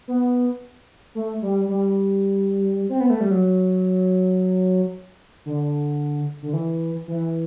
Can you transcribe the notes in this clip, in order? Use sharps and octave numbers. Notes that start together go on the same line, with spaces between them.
B3
A3
G3
G3
C4
B3
A3
G3
F#3
D3
D3
E3
E3